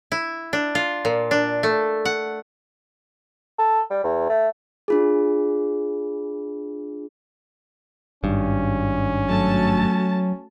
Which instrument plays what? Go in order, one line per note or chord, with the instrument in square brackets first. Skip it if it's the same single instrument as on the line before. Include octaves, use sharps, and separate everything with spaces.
[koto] E4
D4
F4
A#2
D4
A3
F#5
[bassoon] A4
G3
E2
A3
[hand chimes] D4 F4 G#4
[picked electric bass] G#1 G2 [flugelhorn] C#4
[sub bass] F#3 [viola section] A3 F#4 A5